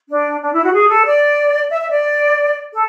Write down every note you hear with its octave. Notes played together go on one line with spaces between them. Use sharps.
D4
D4
E4
F#4
G#4
A4
D5
E5
E5
D5
A4